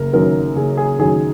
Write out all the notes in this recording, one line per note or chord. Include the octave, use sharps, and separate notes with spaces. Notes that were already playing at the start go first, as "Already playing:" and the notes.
Already playing: F#1 A#4
F#2 D#3 F#3 A#4
F#1 G#4
G#4
F#2 D#3 F#3 G#4